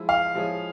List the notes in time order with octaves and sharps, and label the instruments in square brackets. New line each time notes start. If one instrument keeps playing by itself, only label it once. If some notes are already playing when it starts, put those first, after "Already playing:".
Already playing: [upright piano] F3 G#3 E4
[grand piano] F5
[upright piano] F3 G#3 E4 G#4 C#5